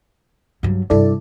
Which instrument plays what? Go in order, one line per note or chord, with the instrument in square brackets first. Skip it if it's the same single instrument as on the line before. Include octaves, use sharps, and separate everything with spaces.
[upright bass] G2 F#3
[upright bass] G2 C3 [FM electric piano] E4 A4 D5